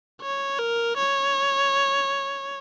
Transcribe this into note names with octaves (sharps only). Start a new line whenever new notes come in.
C#5
A#4
C#5